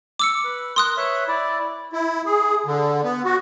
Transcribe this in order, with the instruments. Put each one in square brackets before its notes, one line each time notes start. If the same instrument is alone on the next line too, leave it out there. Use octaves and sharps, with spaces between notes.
[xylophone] D6 E6 C#7
[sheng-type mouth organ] B4
[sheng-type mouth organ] A#4 [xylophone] C6 D#6 F#6
[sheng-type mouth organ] B4 C#5 E5
E4 D5
[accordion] E4
G#4
D3
B3
F#4